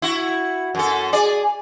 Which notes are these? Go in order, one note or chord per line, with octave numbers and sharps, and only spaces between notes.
E4 F#4
F#2 A4
G#4 D5